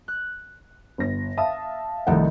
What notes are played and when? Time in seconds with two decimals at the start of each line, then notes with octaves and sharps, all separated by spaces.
0.08 F#6
0.98 G1 A#6
1.37 E5 F5 A5 D#6
2.07 C2 D#3 F3 A3 F#5